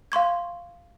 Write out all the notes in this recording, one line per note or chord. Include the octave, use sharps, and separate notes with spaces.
F5 C6 C#6 G#6